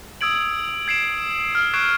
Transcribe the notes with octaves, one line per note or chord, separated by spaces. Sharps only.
D#6 E6 G#6 D7 F#7
G#6 C7 D7 E7
F6 D7
C#6 F#6 G#6 C7 D7 E7